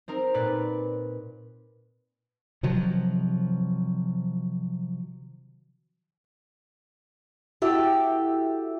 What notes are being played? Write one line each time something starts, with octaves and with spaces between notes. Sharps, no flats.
C4 D#4 A#4
A#2 B4 D5
C3 D#3 F3 F#3
E4 F#4 G4 A4 E5